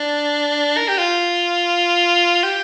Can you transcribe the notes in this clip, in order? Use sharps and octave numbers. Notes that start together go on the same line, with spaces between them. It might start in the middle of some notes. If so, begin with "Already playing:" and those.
Already playing: D4
A#4
G4
F4
G4